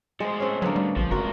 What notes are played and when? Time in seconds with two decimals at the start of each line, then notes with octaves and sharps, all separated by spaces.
0.20 A2 G#3 C5
0.40 C4 C#4
0.62 A2 D3 F#3 A#3 B3
0.76 G3
0.97 A#1 F3
1.11 F#1 G#2 F4 F#4 A#4